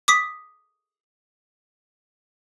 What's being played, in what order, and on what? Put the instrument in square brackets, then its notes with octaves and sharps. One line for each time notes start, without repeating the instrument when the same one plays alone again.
[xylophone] D6 D#6 B6